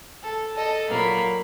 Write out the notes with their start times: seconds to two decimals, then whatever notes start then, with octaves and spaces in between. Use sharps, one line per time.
0.23 A4
0.55 A4 D#5
0.88 A#2 F#3 A#3 B5